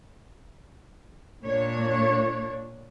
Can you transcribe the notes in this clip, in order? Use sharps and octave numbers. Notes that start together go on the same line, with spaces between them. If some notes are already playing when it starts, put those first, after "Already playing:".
A#2 D4 C#5